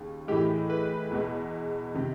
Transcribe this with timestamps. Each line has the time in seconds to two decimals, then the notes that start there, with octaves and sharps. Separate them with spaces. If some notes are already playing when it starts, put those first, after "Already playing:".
Already playing: D#2 C#3
0.28 A2 E3 G#3 G4
0.70 B4
1.11 E2 B2 G#3
1.94 C3 D#3